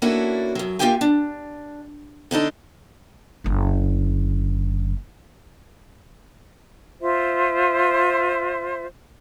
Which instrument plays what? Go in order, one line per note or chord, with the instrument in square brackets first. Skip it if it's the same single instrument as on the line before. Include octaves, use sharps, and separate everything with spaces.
[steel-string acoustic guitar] A#3 C#4 D4 E4 F#4 A4
F#2 F#3
A#3 F4 G4 E5 G5 G#5
D4
D3 D4 D#4 A4
[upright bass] F#1 D3
[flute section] F4 C5 E5